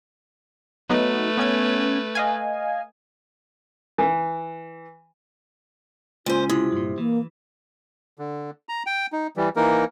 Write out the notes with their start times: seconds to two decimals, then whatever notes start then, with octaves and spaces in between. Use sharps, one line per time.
0.90 F#3 A3 B3 D#4 B4
1.37 B3 C#4 G#6
2.15 D#5 F5 G#5
3.98 E3
6.26 C#2 A#2 C#4 F4 C5 G#5
6.49 C3 E4 D#6
6.72 G2 A#2
6.98 E3 A#3
8.19 D3
8.69 A#5
8.86 G5
9.13 D#4
9.37 E3 G3
9.56 E3 A#3 D#4 A#4